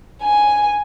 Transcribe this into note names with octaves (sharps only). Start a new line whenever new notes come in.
G#5